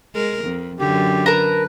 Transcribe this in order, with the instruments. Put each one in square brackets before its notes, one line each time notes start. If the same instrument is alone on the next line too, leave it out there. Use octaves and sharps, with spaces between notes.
[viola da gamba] G#3 A#4
F2
[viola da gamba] F#2 D3 [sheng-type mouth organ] G4
[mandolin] A#4 A5 A#5 [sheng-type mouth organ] B4